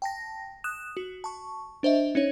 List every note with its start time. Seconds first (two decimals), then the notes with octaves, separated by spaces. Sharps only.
0.02 G5 A5 A#6
0.64 D#6 F#6 E7
0.97 F#4
1.24 A5 C#6
1.83 D4 C5 D#5 E5
2.15 C#4 D#4 C#5